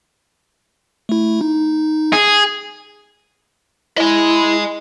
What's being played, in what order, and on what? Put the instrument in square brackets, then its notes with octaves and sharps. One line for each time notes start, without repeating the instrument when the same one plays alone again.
[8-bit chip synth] A3 E4
D#4
[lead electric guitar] G#4
[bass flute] E4 [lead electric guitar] D#5 G#5